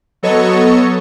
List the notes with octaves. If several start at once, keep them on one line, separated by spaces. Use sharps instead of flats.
F#3 B3 A4 C#5 D#5 C#6